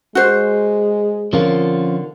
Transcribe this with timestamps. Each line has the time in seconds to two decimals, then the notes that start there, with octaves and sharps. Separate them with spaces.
0.15 G#3 F#4 C5
1.33 D3 F3 C4 C#4 F4 A#4